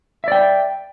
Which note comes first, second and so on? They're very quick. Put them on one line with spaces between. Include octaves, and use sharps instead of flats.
E5 D5 G5